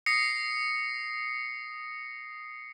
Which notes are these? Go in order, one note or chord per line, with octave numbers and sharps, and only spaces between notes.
D#6 A#6 C7 C#7